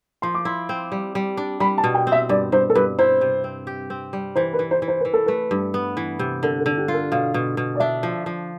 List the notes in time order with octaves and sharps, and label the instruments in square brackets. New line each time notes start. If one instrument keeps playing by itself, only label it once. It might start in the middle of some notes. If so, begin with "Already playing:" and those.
[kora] F3 [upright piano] C6
[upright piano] D6
[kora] E4 [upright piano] C6
[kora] C4
G3
G3
D4
[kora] G3 [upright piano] B5
[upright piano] A5
[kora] B2
[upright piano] G5
[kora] C4
[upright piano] E5
[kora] G2 [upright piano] D5
[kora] G2 [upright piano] C5
[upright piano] A4
[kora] G2 [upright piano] B4
[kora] E4 [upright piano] C5
[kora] C3
C4
G4
C4
G3
[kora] E3 [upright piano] C5
[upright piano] B4
[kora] E3
[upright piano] C5
[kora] E3
[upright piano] C5
[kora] E3 [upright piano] B4
[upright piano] A4
[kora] A3 [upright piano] B4
[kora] G2
B3
E3
C3
[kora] D3 [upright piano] A4
[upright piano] A4
[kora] D3
[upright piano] G4
[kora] F4
[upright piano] A4
[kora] B2 [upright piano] F5
[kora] B2
B2
[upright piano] D5
[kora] D4 [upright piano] E5
[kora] F3
F3